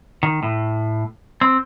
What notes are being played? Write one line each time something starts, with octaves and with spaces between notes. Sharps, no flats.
D#3
A2
C4